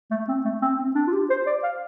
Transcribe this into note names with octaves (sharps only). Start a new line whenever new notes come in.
A3
C4
A3
C4
C4
D4
F4
G4
C5
D5
F5